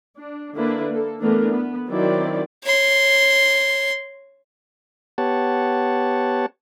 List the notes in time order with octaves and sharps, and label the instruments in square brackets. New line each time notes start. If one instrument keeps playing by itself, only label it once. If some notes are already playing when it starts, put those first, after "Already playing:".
[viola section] D4
D3 A#3 D4 E4 B4
A#3 A4
E3 A3 B3 D4 A#4
B3
D#3 F#3 C4 E4 D5
[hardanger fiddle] C#5 C6
[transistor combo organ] B3 G4 C#5 F#5 A5